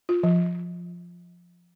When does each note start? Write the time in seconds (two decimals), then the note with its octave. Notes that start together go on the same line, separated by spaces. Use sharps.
0.09 F4
0.23 F3